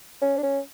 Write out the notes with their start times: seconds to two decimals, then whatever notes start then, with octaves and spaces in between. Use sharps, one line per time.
0.22 C#4
0.38 D4
0.43 C#4